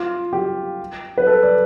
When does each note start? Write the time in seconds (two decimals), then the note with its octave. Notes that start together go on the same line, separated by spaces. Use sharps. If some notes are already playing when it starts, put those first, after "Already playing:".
Already playing: F4
0.33 G4
1.18 B4
1.27 A4
1.43 D5